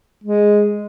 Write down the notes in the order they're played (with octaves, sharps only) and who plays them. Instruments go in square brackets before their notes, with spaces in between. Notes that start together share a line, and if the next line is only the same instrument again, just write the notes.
[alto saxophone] G#3